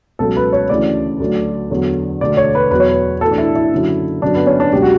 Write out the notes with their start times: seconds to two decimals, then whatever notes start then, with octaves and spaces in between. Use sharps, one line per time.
0.19 C#2 B2 F#3 A4
0.37 B4
0.53 C#5
0.69 D2 C#3 E3 D5
1.20 D2 D3 F#3
1.70 E2 D3 F#3
2.21 E1 D2 D3 D5
2.37 C#5
2.55 B4
2.71 E2 B2 F#3 B4
2.80 C#5
2.89 B4
3.21 B1 A2 E3 A4
3.32 D4
3.38 E4
3.56 E4
3.72 F#1 F#2 D3 F#3
4.22 G1 F#2 D3 F#3 D4
4.35 B3
4.47 C#4
4.60 D4
4.73 C#2 B2 F#3 G4
4.82 F#4